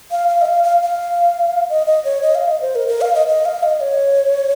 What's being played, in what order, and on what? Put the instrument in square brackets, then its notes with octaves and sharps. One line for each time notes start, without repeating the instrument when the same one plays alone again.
[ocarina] F5
F5
D#5
F5
F5
F5
D#5
D#5
C#5
D#5
F5
D#5
C5
A#4
A#4
F5
D#5
D#5
F5
D#5
C#5